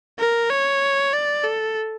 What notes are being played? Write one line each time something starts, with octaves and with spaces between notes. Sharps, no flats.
A#4
C#5
D5
A4